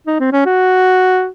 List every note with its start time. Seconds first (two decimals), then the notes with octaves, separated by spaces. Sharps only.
0.07 D#4
0.20 C4
0.33 C#4
0.46 F#4